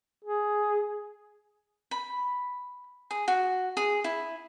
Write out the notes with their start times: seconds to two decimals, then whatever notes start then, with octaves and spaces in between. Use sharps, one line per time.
0.24 G#4
1.91 B5
3.11 G#4
3.28 F#4
3.77 G#4
4.04 E4